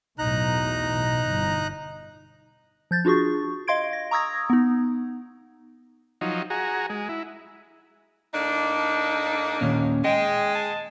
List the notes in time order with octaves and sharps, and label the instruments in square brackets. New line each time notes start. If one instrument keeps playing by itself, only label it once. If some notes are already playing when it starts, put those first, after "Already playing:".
[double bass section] B1 E2 A2 [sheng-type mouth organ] D#4 A#5 F#6
[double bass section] G1
[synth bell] F3 G6 A6
D4 F4 F#4 G#4 C#6
D#5 F5 C6 G#6 D7
A#6
A#5 C#6 D#6 E6 G#6 A#6
B3 D#4
[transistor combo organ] F3 F#3 D#4
F#4 G#4 A#5
G#3
E4
[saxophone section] A2 A#3 D4 [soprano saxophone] D#4
[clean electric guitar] D#2 A#2 C#4
[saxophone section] G#3 [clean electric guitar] D#5 [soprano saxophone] G5
[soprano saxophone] A5